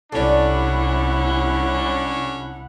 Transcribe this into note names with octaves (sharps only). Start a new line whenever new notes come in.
C2 C#4 D4 E4 A4 D5 F#5